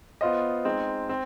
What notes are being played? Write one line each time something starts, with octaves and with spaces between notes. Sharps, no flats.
B3 F4 C5 D#5
G#3 C4 D#4
C4